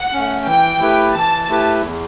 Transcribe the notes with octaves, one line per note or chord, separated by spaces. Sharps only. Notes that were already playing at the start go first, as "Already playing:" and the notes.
Already playing: F#5
A3 C#4
E3 G5
A3 E4 G4 B4
E3 A5
A3 E4 G4 B4
E2